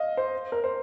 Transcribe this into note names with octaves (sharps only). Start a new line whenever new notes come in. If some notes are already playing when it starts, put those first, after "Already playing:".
Already playing: D#5 F5
C5
A#4
C5